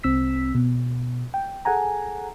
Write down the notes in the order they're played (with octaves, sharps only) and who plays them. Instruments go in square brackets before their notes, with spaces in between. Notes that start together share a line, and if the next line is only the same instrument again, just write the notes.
[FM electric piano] C2 C4 E6 B6
B2
G5
G#4 A4 F#5 G#5 A#5